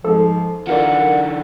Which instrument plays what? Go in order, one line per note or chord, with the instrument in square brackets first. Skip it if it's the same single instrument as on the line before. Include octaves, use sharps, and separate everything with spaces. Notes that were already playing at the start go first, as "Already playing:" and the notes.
[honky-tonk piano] G#2 G#3 [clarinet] F3 [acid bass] A4
[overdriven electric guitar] D3 E3 [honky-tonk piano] F4 A#4 D5 [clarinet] F#5